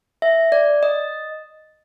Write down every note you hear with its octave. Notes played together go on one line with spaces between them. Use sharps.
E5
D5
D#5